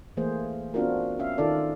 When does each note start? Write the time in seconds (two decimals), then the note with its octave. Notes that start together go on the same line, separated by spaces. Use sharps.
0.17 E3 A3 A#3 G#4 C5
0.74 B3 C4 D4 F4 F#4 A#4
1.19 C#4 E5 F5
1.38 D#3 D#4 F4 A4 D5